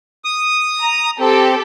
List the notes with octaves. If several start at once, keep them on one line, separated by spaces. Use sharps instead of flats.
D#6
A#5
C4 G4 A4